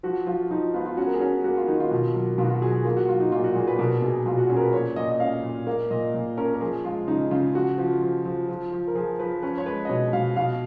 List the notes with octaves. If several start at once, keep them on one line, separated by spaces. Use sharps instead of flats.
F3 F#4
F3 F4
F3 D#4
B3 F4
F4
C#4 F#4
A#4
G#4
C#4 F#4
A#3 F#4
F4
D#3 D#4
F4
B2
F#3
B2 F4
F#4
F4
F#3 G#4
G#4
A#3 F4
F#4
F#3 F4
D#4
A#2 F4
F#4
A#2 G#4
B4
B2 A#4
B2 G#4
B2 F4
F#4
C#4 G#4
A#4
B4
A#2 C#5
A#2 D#5
D#5
C#4 F5
A#2
A#3 F5
A#2 D#5
A#2
C#4 A#4
A#4
F3 G#4
G#3 F4
C#3 D#4
C#3 F4
F3 F#4
F3 F4
F3
F3
F3
F3
A#4
F3 G#4
F3 B4
C#4 B4
C#5
G#3 B4
D#5
B2 C#5
B2 F5
B2 F5